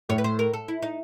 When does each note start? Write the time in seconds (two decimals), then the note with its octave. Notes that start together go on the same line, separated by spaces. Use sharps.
0.09 A2 A3 C#5
0.18 B4
0.24 C5
0.39 A#4
0.53 A4
0.68 E4
0.82 D#4